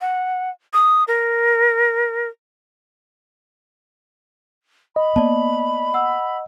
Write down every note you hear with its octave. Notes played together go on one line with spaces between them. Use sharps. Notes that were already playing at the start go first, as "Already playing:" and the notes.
F#5
D#6
A#4
D#5 B5
A#3 B3 D5 A5
F#5 E6